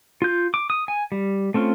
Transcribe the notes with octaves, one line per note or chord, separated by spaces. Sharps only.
F4 G6
D6
D#6
G#5
G3
A3 C4 C#4 F4